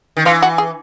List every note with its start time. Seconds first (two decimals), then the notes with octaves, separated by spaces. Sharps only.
0.17 D#3
0.25 E3 F4
0.42 F#4
0.58 G#4